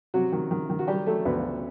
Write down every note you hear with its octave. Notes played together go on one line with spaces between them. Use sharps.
C3 F#3 F#4
D#3
D#3
D#3
F#4
F#3 G3 G4
F#3 A3 A4
D2 B3 B4
C#3